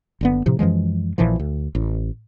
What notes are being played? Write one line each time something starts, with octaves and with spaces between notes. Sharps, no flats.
F#1 D3 B3
A2 C3 F3
F#2 E3 F3 G#3
A#1 A#2 E3 F3
D2
A1